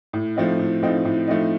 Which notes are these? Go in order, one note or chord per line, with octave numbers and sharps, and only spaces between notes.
A2
F3 A3 C4 D#4
A2
F3 A3 C4 D#4
A2
F3 A3 C4 D#4